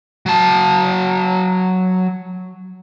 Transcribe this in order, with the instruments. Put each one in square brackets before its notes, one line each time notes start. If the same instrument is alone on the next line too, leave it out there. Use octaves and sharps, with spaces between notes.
[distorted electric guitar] F#3 A5